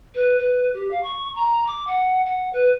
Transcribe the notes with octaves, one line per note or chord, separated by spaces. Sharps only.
B4
B4
G4
F5
C#6
A#5
D6
F#5
F#5
B4